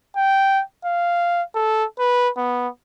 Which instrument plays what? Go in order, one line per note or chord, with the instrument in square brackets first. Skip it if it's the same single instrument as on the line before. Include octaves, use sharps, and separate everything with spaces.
[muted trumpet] G5
F5
A4
B4
B3